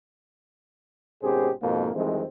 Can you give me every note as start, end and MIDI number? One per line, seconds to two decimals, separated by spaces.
1.23 1.51 32
1.23 1.51 47
1.23 1.51 61
1.23 1.51 67
1.23 1.51 68
1.23 1.51 72
1.63 1.90 41
1.63 1.90 44
1.63 1.90 47
1.63 1.90 58
1.95 2.25 41
1.95 2.25 51
1.95 2.25 52
1.95 2.25 55
1.95 2.25 56
1.95 2.25 60